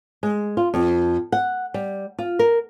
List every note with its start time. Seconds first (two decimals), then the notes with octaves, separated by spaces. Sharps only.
0.23 G#3
0.57 F4
0.74 F2
1.32 F#5
1.74 G3
2.19 F4
2.39 A#4